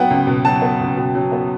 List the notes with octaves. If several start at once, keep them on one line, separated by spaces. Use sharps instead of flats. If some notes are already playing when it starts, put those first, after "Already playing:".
Already playing: F#3 B3 F#5 G5
C#2
B2
F#3 A5
B3
C#2
B2
F#3
B3